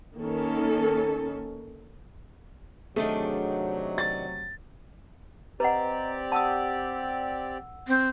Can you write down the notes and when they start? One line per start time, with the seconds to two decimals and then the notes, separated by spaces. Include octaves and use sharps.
0.18 D#3 A#3 C#4 A4
2.96 C3 D#3 F#3 A3 D4 G#4
3.98 A6
5.60 C4 G4 B4 D5 D#5 F#5 A#5
6.32 F#5 A5 D#6 E6
7.88 C4